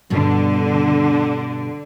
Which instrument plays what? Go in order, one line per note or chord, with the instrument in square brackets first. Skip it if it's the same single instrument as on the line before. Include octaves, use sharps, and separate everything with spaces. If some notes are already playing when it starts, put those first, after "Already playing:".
[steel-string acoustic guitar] G2 B2 [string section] D3